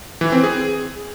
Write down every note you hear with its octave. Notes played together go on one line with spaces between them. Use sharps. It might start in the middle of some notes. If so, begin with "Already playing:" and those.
E3
C4
G#4